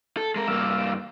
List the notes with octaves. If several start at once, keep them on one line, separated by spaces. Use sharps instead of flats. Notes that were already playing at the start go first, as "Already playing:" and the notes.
A4
G#3 A#4
G2 A#3 F5 D6 E6